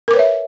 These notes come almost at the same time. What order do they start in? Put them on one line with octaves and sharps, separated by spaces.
A#4 D6 B4 C#5 E5